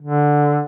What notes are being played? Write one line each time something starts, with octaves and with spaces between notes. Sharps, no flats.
D3